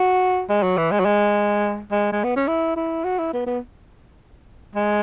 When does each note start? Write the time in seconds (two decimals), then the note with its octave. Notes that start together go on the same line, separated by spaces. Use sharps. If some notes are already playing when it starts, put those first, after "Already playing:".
Already playing: F#4
0.49 G#3
0.63 F#3
0.77 E3
0.91 G#3
0.99 F#3
1.05 G#3
1.91 G#3
2.12 G#3
2.24 B3
2.36 C#4
2.47 E4
2.76 E4
3.04 F#4
3.19 E4
3.33 B3
3.46 B3
4.75 G#3